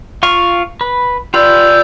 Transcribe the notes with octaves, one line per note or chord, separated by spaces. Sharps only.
F4 F5 C#6
B4
F4 G4 B4 D5 E6 G6